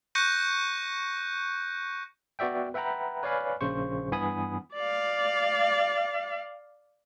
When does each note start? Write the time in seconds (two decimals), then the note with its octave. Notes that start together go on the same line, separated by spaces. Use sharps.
0.15 C#6 F#6 G6 A#6 C#7 D#7
2.39 B3 F#4 D5 E5 G5
2.74 B4 E5 F#5 G5 A#5 B5
3.23 B4 C#5 D5 F5 G#5 B5
3.61 A#1 C#3 C5 C#6
4.11 G2 E3 B3 G#5 B5 D#6
4.74 D5 F5